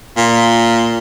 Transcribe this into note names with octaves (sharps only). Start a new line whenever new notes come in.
A#2